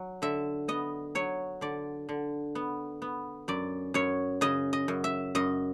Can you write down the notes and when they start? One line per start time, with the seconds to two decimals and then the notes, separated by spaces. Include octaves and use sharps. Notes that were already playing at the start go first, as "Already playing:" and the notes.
Already playing: F#3
0.22 D3 E5
0.68 B3 D#5
1.15 F#3 C#5
1.61 D3 D5
2.09 D3
2.55 B3
3.02 B3
3.48 F#2 D5
3.94 F#2 C#5
4.41 C#3 D#5
4.73 D#5
4.88 F#2
5.04 E5
5.35 F#2 D#5